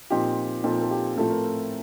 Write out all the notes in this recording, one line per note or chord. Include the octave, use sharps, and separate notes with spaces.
A#2 F3 C4 D#4 G4
A#2 F3 C4 D#4 A4
A4
G4
A2 F3 A3 C4 A4
A#4